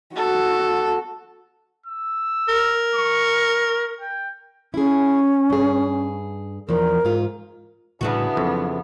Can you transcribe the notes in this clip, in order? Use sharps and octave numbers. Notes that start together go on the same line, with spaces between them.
F#4 A4
E6
A#4
C#6
G5
C#4 E4 G#4
G2 G#4
E2 F3 A#4
G#2 F4
D1 A2 C#3 E3 G3 B3 D4 F#4
F2 F#3